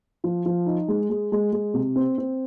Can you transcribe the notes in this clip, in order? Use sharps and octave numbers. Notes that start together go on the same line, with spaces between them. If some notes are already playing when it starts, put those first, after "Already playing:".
F3
F3
D#4
G#3
G#3
G#3
G#3
C3
C4
C4